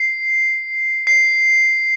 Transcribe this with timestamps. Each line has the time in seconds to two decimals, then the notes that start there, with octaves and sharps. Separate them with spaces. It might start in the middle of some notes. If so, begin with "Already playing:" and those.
Already playing: C7
1.07 C7